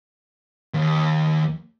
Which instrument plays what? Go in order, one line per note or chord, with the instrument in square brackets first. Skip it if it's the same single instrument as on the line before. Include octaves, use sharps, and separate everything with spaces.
[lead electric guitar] D#2